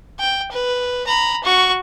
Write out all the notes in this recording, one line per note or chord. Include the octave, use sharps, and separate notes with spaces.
G5
B4
A#5 B5
F#4 C#6